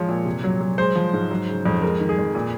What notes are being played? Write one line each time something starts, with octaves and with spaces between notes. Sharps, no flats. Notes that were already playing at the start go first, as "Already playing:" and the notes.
Already playing: F3 G#3 C#5
A#2
C3
F#3
F#3
G#3 C5
F3
G#2
F#3
C#3
F2
G#3 A#4
D#3
G#4
F2
A#2